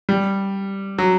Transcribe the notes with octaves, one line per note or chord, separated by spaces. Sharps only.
G3
F#3